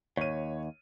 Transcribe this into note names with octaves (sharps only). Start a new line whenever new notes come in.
D#2 C#5 D#7